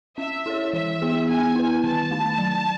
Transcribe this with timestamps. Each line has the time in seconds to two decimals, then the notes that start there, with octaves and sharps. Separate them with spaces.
0.18 C#4 E5
0.46 E4 A4 C#5
0.73 E3 E5
1.02 B3 E4 G#4
1.29 B3 G#5
1.56 E4 B4
1.84 D#3 A5
2.11 A3 D#4
2.38 F#3